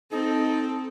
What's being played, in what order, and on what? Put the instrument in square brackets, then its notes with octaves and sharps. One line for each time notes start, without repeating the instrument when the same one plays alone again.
[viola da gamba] C4 [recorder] D#4 [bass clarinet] A4